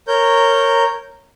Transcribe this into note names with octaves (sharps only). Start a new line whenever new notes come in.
A#4 C#5 G6